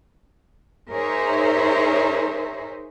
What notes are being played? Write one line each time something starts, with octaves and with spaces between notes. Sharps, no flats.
D#4 G#4 A#4 C5 C#5 E5